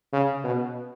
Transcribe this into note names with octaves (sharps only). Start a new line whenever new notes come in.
C#3
B2